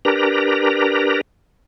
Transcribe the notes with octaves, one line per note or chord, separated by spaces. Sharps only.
D4 G4 A#4 B4 A#5